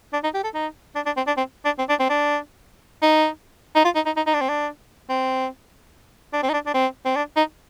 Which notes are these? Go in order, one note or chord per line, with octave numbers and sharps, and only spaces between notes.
D4
D#4
G4
A4
D#4
D4
D4
C4
D4
C4
D4
C4
D4
C4
D4
D#4
D#4
F4
D#4
D#4
D#4
D#4
D4
C4
D4
C4
D4
C4
D#4
D4
D4
C4
C4
D4
D#4